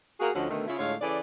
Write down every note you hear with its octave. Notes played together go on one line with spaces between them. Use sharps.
A#3 F#4 G#4
D2 D3 F3 C#4 F#4 D#5
B2 D3 D#3 A3
C#3 E4 F4
A2 D3 G#3 F4 C#5 F5
C#3 E3 A4 D5